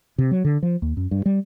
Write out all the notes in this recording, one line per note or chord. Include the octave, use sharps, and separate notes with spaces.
C3
F#3
D3
F3
D#2
F#2
G2
G3